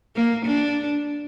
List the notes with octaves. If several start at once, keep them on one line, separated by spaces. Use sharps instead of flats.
A#3
D4